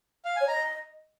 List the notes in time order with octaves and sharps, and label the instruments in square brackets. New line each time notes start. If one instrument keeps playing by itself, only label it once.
[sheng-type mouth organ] F5
[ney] C#5 [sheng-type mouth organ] G#5
[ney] D#5 [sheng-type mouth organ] A#5